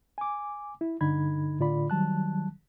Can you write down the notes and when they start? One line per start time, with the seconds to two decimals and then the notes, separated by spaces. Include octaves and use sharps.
0.18 G#5 D6
0.81 E4
1.01 G2 D3 D#4 B5 G#6
1.59 A2 D3 F4 D5 B5
1.90 D#3 F#3 G3 A5 F#6